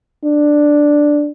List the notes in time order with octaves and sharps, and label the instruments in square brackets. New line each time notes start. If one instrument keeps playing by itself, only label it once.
[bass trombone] D4